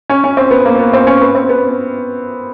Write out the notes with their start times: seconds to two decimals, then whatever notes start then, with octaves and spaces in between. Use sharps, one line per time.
0.09 C#4
0.24 C#4
0.37 C4
0.51 B3
0.65 A#3
0.79 B3
0.93 C4
1.07 C#4
1.22 B3
1.35 C4
1.49 B3